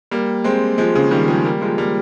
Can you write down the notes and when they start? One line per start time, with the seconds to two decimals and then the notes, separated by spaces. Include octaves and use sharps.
0.11 G3 A#3
0.44 G#3 C4
0.78 F3 G#3
0.95 C#3 F3
1.11 D#3 G3
1.28 F3 G#3
1.45 G3 A#3
1.61 F3 G#3
1.78 G3 A#3